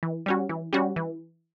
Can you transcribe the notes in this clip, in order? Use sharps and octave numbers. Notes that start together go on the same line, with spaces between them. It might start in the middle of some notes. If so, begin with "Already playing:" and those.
E3
G3 C#4 F#4
E3
G3 C#4 F#4
E3